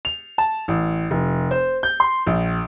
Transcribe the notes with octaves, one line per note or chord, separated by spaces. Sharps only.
F7
A5
A1
F1
C5
G6
C6
A#1